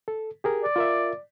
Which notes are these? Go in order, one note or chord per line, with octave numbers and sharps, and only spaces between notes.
A4
G4 G#4 A#4
D5
F4 A#4 E5